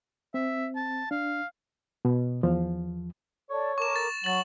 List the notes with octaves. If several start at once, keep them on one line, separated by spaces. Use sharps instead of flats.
C4 E5
A5
D4 F5
B2
E2 F3
A4 C#5 D5
A4 A#4 C#6 D6 E7
A6
F#3 F#5 C#6 A6 F#7